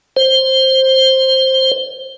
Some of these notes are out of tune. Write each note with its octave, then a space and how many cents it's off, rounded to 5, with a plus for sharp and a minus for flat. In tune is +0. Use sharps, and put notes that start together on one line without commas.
C5 +10